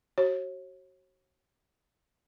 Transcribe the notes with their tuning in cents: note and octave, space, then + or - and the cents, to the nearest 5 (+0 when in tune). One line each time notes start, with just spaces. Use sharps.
F#4 +25 C#5 -40